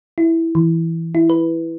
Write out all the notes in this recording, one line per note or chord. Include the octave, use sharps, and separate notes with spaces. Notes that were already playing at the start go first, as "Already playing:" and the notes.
E4
E3
E4
B4